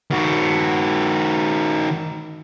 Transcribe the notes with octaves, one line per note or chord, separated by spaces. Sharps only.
D#3 F#4